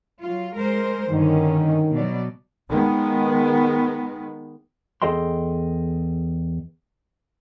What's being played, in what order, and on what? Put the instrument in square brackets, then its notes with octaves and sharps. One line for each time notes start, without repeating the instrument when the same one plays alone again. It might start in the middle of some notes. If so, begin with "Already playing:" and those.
[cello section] F#3 F4
G#3 A#4 C5
[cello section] G2 D3 C#4 [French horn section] D#3
[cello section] B2 F#3 D5
[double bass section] D#3 G#3 B3
[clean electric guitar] E2 G#4 A4 D#5 G5 C6